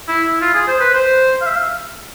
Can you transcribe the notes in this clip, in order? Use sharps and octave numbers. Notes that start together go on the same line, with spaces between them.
E4
E4
F4
G#4
C5
B4
C5
F5
E5
F5